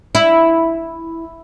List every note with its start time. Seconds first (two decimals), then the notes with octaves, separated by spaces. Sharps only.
0.15 E4